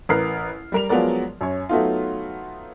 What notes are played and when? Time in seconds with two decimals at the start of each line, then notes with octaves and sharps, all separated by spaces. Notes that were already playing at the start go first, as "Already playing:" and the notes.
0.09 A1 A#4 B4 A#5 F6 C7
0.72 G3 A#4 F7
0.89 F3 F#3 G#3 B3 A#4 D5
1.41 F#2 C#5
1.69 F#3 A3 B3 D#4 F4